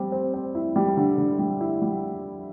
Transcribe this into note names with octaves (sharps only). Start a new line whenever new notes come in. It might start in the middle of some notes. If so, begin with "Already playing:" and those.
Already playing: G3 C4
C4
C4
E4
G3
D3
D3
G3
E4
G3